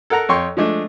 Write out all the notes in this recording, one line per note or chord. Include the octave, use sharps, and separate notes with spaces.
A4 A#4 F#5 A#5
F2 C#5 G5 C6 C#6
F3 G#3 A3 D4